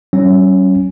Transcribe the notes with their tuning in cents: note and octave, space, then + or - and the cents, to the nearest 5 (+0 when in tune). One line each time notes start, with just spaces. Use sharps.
F#3 +45 C#4 -5